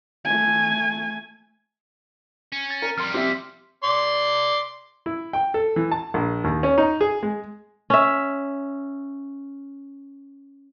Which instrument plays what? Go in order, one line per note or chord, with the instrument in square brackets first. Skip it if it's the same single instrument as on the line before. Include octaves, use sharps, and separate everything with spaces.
[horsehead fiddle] A3 G#5
[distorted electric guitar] C#4
[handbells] A6
[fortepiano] A#4
[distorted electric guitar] F2 G3 [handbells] C6 F6
[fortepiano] C4 E5 [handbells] G4 B6
[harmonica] D5 C6
[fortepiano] E4
G5
A4
E3
A5
A#1
D#2
C#4
D#4
G#4
G#3
[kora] C#4 E5